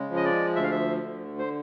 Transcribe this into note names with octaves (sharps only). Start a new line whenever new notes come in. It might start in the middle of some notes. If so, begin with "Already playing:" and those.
Already playing: C#3 G#3
F3
D#5
D5
D2 E5
F5
E5
D3
C5